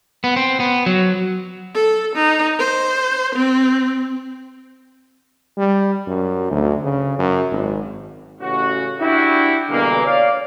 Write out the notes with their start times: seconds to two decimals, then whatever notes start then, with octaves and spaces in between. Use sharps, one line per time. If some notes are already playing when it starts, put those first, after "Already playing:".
0.24 B3
0.36 C4
0.60 B3
0.86 F#3
1.74 A4
2.16 D#4
2.59 C5
3.35 C4
5.58 G3
6.07 F#2
6.51 D2
6.84 C#3
7.19 F#2
7.51 G#1
8.40 A1 C#3 F#4
9.00 D4 E4 F#4 G4
9.69 B2 D3 E3 G3 G#3 A#3
10.05 C#5 D5 F5